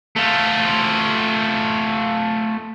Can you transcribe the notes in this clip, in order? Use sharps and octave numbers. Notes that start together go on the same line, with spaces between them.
A3 F4